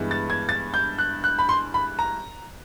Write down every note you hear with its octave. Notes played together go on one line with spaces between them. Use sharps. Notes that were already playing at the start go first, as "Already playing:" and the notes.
Already playing: G2 E3 G#3 B3
A6
G#6
A6
G6
F#6
F#6
B5
C6
B5
A#5